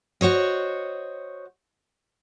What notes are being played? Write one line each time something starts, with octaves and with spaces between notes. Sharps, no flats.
F#4 C5 C#5 D#5